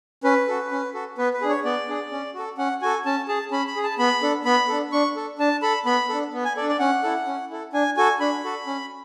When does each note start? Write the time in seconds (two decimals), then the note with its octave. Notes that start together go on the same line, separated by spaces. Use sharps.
0.24 C#4 B4
0.48 F#4 A4
0.71 C#4
0.94 F#4 A4
1.18 B3 B4
1.33 B4
1.41 D4 G#4
1.49 C#5
1.64 B3 D5
1.87 D4 G#4
2.12 C#4
2.34 F#4 A4
2.58 C#4 F#5
2.82 F#4 A4 G#5
3.06 C#4 A5
3.28 G#4 A5
3.51 C#4 B5
3.68 B5
3.76 G#4
3.84 A5
3.99 B3 B5
4.23 D4 A4
4.45 B3 B5
4.69 D4 A4
4.92 D4 C#6
5.16 A4
5.39 D4 A5
5.62 A4 B5
5.86 B3 B5
6.09 D4 A4
6.34 B3
6.45 G#5
6.57 A4 D5
6.61 D4
6.69 D5
6.79 C#4 F#5
7.04 E4 A4
7.26 C#4
7.50 E4 A4
7.73 D4 G#5
7.97 F#4 A4 G#5
8.20 D4 B5
8.43 F#4 A4
8.67 C#4